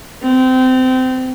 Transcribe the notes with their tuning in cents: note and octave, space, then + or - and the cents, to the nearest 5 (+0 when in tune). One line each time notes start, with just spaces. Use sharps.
C4 -25